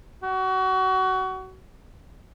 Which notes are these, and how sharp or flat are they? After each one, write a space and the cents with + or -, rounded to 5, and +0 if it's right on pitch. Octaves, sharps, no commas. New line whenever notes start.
F#4 +25